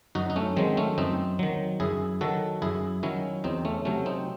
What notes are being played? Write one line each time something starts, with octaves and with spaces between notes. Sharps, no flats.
F#2 D#4 F#4
D#4
A3 C#4
D#3 F#3 G#3 C4
A3 C#4
F#2 C4 D#4
D#3 F#3
F#2 E4 G#4
D#3 F#3 F#4 A4
F#2 E4 G#4
D#3 F#3 C#4 E4
E2 C4 D#4
A3 C#4
C3 F#3 A3 C#4
C4 D#4